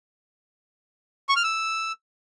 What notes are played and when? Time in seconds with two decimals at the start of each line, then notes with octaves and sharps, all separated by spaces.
1.29 C#6
1.36 F6
1.43 E6